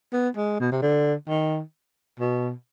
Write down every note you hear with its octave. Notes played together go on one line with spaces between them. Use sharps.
B3
G#3
B2
C3
D3
D#3
B2